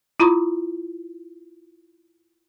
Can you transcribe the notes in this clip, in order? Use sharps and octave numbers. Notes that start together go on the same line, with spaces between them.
E4 F4 A#5 B5 C#6 D#6